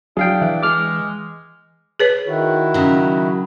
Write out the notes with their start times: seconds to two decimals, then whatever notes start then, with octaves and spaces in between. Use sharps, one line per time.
0.17 F#3 D4 E4 G#4 F5 G5
0.42 E3 E5 F#6
0.63 G#3 D6 F6
2.00 G#4 B4 C#5
2.27 D#3 E4 F#4
2.74 C#3 F#3